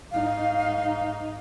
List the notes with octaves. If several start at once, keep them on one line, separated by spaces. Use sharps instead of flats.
G#2 D#4 F5